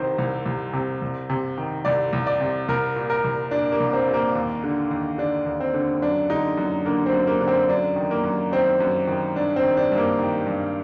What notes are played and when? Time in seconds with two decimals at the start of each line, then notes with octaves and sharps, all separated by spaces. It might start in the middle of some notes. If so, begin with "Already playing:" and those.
Already playing: C2 C3 D#3 C5
0.18 C2
0.46 C2
0.73 C3
1.02 C2
1.30 C3
1.58 D#3
1.85 C2 D5
2.13 C2
2.27 D5
2.40 C3
2.68 C2 A#4
2.96 A#2
3.10 A#4
3.24 C2
3.51 A#2 D4
3.72 A#3
3.80 C2
3.93 C4
4.08 A#2
4.14 A#3
4.35 D#2
4.64 D3
4.91 D#2
5.18 D3 D4
5.46 D#2
5.60 C4
5.74 D3
6.02 F#2 D4
6.30 D3 D#4
6.58 F#2
6.85 D3 A#3
7.06 C4
7.13 F#2
7.27 A#3
7.41 D3
7.48 C4
7.69 F#2 D4
7.96 D#3
8.11 A#3
8.24 F#2
8.52 D#3 C4
8.80 F#2
9.07 D#3
9.36 G2 D4
9.56 C4
9.63 D#3
9.77 D4
9.92 G2
9.98 A#3
10.19 D#3
10.47 G2